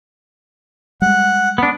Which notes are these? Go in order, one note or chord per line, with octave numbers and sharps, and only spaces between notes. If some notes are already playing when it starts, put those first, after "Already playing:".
G3 G#3 F#5
B3 D4